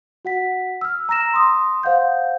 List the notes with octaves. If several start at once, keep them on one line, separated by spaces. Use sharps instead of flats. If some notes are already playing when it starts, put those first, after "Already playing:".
F#4 F#5 B6
E6 F6
A#5 E6 A#6 E7
C6 D#6
C5 F5 F#5 G6